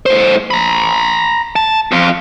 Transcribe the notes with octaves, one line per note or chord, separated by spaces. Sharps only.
A2 C5
A#5 B5
A5
F2 F4